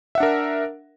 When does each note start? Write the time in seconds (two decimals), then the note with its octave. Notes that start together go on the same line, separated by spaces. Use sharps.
0.15 E5
0.18 F#5
0.20 D4
0.23 A#4